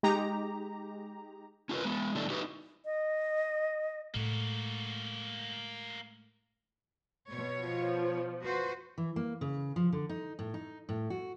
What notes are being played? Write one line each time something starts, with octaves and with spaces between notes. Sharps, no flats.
G#3 D#4 G4 A#5
C#4 F4 G#4 A#4 B4
G#3 B3
D3 F#3 G3 A3 D4 E4
D#4 E4 F#4 G4 B4
D#5
A2 G#3 A#3 F#4
B2 C#5
F3
F#4 B4 C5
E3
A#3
C#3
F3
D3
D#4
A2
D#4
A2
F#4